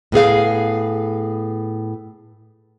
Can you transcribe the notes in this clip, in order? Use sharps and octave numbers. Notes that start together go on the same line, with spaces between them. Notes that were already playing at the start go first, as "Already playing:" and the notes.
A2 B3 G#4 F5